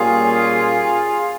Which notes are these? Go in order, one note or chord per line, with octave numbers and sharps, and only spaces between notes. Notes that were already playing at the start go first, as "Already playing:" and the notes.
Already playing: A#2 G3 A#3 C#4 F4 G#4